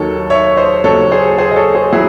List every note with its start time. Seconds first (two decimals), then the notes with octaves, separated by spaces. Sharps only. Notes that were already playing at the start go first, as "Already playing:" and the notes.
Already playing: D#2 D#3 F#3 A4 C#5
0.30 C#5 E5
0.57 C5 D#5
0.84 D#2 C#3 F#3 A4 C#5
1.11 G#4 C5
1.38 G#4 C5
1.51 D#5
1.56 A4 C#5
1.75 G#4 C5
1.92 F#3 E4 G#4